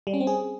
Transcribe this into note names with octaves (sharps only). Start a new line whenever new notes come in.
G3
C#4
C4
G#4